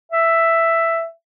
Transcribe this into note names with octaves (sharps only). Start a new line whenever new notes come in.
E5